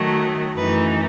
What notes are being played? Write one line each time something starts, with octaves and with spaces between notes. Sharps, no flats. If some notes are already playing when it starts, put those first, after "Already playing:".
Already playing: D#3 F#3 A3
F#2 E3 A3 D#4 B4